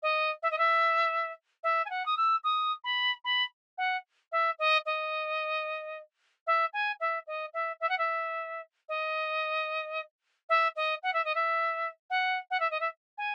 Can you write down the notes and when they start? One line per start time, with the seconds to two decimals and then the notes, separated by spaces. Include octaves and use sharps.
0.02 D#5
0.43 E5
0.51 D#5
0.58 E5
1.63 E5
1.85 G#5
1.90 F#5
2.06 D#6
2.17 E6
2.44 D#6
2.84 B5
3.25 B5
3.78 F#5
4.32 E5
4.59 D#5
4.86 D#5
6.47 E5
6.73 G#5
7.00 E5
7.27 D#5
7.54 E5
7.80 E5
7.89 F#5
7.98 E5
8.89 D#5
10.49 E5
10.76 D#5
11.03 F#5
11.13 E5
11.25 D#5
11.35 E5
12.10 F#5
12.51 F#5
12.60 E5
12.71 D#5
12.80 E5
13.18 G#5